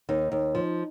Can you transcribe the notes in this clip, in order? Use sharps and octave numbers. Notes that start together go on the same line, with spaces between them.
D#2 D#4
D#2
F3